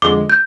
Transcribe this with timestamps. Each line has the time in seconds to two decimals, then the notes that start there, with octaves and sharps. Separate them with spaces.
0.02 F2 D3 G#3 D6
0.30 G6